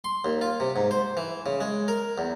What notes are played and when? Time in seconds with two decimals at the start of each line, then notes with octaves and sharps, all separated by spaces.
0.04 C6
0.25 D#2
0.41 F4
0.60 C3
0.76 G#2
0.91 C5
1.17 E3
1.46 C#3
1.61 G#3
1.88 A#4
2.18 E2